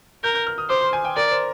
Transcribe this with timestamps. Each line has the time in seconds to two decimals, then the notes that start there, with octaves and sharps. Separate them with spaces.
0.24 A#4 G6
0.35 G6
0.47 F6
0.58 D#6
0.69 C5 D6
0.81 C6
0.93 G#5
1.05 G5
1.16 A#4 D5
1.31 C5